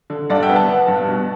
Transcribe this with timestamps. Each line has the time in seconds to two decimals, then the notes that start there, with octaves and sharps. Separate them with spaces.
0.10 D3
0.30 G2 D5 F#5
0.42 E5 G5
0.49 B3
0.56 F#5 A5
0.68 B3
0.88 G2
1.08 B2